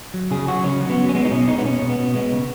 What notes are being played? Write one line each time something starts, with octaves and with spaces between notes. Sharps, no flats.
F#3
C#3 G#4
F#3 F#4
C#3 C#4
F#3
B3
F#3
C#4
G#3 B3
D#4
B2 C#4
G#3 D#4
B3
B2 C#4
B2
B3
B2
G#3 B3
C#3